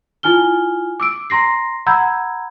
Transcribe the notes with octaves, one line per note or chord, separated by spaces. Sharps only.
E4 F4 G#5 F6 G7
D6 E6 D7
A#5 C6 A#6 C7
F#5 A#5 B5 E6 G6 G#6